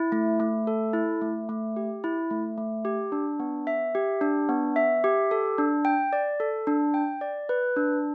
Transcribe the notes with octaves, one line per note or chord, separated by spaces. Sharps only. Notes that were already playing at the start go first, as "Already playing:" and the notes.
Already playing: E4
A3
A3
A4
E4
A3
A3
G4
E4
A3
A3
G4
D4
B3
E5
G4
D4
B3
E5
G4
A4
D4
G5
D5
A4
D4
G5
D5
B4
D4